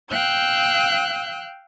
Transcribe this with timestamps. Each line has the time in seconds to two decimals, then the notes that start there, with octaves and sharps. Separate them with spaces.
0.11 F5 G5 E6 F#6 G6